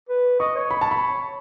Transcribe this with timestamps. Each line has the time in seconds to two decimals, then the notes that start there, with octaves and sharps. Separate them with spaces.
0.09 B4
0.40 D#5 C#6
0.55 C#5
0.71 B5
0.81 A5
0.91 B5